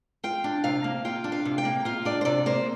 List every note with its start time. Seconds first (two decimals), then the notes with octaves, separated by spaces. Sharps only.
0.24 F4 G5
0.44 D4
0.64 C3 F5
0.84 A#3
1.05 F4 G5
1.24 D4
1.32 F5
1.45 C3
1.58 G5
1.65 A#3
1.85 F4 F5
2.05 D4 D5
2.21 C5
2.25 C3 D5
2.46 A#3 C5